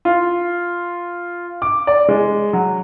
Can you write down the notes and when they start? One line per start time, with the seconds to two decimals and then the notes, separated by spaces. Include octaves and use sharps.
0.05 F4
1.62 D6
1.87 D5
2.08 G#3
2.53 F#3